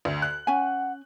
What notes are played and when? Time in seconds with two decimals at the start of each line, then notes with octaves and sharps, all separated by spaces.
0.05 D2
0.22 F#6
0.47 C#4 F#5 G#5